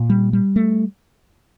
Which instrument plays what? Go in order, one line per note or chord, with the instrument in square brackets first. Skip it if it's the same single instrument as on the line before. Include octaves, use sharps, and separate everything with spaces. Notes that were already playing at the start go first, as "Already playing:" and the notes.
Already playing: [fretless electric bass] A#2
G3
G3
A3